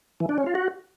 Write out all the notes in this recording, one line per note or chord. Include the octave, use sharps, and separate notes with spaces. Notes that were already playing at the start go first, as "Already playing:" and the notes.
E3
D4
C#4
F4
F#4